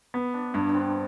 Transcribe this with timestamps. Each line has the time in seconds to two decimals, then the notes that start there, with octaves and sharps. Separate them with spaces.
0.14 B3
0.34 D4
0.54 G2 D4
0.69 D4
0.74 C4